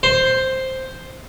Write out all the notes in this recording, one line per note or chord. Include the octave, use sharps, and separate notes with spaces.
C5